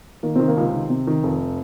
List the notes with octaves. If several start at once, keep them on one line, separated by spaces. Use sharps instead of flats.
D#3 A#3
C3 D#3 C4
A#3
C#2 C3 C4
D#3
C3
D#3
F1